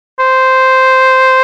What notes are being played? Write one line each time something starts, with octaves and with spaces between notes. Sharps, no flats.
C5